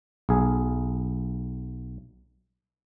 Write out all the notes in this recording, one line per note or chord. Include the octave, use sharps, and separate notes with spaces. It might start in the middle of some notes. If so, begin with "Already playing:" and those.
B1 G#4